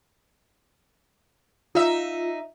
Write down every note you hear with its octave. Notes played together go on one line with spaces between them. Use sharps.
D#4 F4 E5